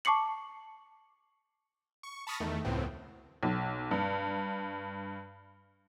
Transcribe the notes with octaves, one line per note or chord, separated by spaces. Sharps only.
A5 C#6 D6 C7 C#7 F#7
C#6
A5 B5 C#6 D#6 F6 A#6
E2 D#3 A3
C#2 F#2 A2 B3 C4
B1
G2